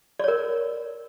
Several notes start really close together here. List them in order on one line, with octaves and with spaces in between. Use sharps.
D5 C#5 A#4